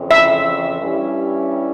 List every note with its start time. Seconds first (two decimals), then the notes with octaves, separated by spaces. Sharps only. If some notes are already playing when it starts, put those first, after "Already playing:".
Already playing: F2 C#3 E3
0.11 E5
0.80 G2 G3 C#4 E4